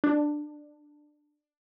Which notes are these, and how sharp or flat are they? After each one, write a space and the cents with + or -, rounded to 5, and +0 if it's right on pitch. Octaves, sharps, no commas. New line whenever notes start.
D4 +15